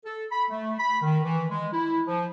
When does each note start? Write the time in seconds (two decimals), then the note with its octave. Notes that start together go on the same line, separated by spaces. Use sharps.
0.05 A4
0.32 B5
0.50 A3
0.79 B5
1.02 D#3
1.25 E3
1.51 G#3
1.73 E4
2.07 F3